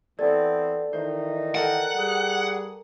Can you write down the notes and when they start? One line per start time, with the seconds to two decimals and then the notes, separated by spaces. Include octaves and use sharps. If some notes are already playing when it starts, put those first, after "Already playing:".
0.19 E3 B3 C4 A4 D5
0.93 D#3 E3 D#4 C5
1.55 A4 A#4 F#5 G5
1.95 G3 G#4